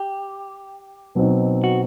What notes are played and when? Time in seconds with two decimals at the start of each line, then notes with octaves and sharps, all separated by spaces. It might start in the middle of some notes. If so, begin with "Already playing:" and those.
Already playing: G4
1.15 B2 F#3 C4 D#4
1.64 F#4